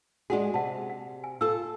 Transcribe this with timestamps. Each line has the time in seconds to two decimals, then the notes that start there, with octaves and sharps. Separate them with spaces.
0.30 G#3 D4 F#4 G#4 F#5 C6
0.54 C3 F#5 A5
0.90 F#5
1.24 G#5
1.41 F4 A4 E6